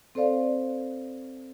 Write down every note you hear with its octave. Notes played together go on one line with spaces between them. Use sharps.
C4 A4 C5 D5 F5